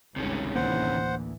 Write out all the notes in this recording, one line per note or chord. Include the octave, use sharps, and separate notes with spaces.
G1 C#2 C3 D#3 C#4
A1 D2 E3 A#3 C5 F#5